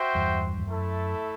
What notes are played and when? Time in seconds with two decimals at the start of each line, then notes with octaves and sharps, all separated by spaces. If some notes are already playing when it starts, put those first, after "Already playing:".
Already playing: F#4 C5 E5 G5
0.15 E2 G2
0.58 E2
0.66 F#2 A3 E4 A4